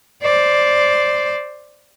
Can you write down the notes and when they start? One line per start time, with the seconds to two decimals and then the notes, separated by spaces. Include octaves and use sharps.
0.23 C5 D5